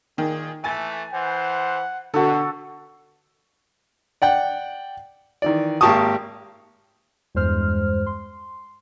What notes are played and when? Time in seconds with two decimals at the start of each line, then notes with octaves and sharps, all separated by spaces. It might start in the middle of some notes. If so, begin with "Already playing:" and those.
0.18 A#2 D#3 G#4
0.64 E3 A3 G#5 A6
1.13 E3 C5 F#5
2.14 B2 D3 F#4 A4
4.22 D5 F#5 G5
5.42 D#3 E3 D5
5.81 G#1 A#3 G4 A5 C#6 D#6
7.35 E2 G2 G#3 C5 F6
8.06 C6